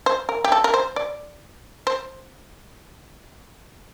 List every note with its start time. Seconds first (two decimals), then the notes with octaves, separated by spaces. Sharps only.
0.06 C5
0.29 A#4
0.44 G4
0.52 A4
0.64 A#4
0.74 C5
0.96 D5
1.87 C5